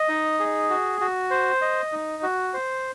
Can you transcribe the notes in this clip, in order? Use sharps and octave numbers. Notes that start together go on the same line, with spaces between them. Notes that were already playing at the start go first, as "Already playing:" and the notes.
Already playing: D#5
D#4
G#4
F#4
F#4
C5
D#5
D#4
F#4
C5